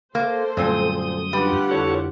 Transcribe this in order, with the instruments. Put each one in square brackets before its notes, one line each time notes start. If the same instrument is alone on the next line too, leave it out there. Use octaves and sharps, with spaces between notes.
[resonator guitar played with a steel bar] A#3 [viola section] A4 C5
[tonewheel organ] F#2 D#6 [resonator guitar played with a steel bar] A#2 C4 [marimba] D3 G3 A3
[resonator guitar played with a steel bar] G3 [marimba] D4 B4 [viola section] F4 G4 F#5
[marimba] F2 D3 E4 [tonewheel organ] A4 C#5